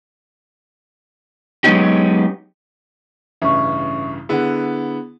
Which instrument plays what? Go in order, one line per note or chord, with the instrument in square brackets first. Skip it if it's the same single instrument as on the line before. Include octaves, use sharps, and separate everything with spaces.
[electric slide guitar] F#3 G#3 B3 C#4 D#4 G4
[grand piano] A1 G2 C#3 [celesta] E5 C#6
[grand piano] D3 B3 E4 [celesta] G#4 F#5